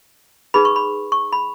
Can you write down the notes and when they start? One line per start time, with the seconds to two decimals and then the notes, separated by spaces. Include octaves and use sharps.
0.54 D#4 G#4 B4 B5
0.65 C#6
0.76 B5
1.12 C#6
1.33 B5